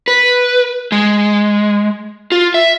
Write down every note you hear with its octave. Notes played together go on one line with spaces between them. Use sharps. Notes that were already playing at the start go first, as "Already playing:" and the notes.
B4
G#3
F4
E5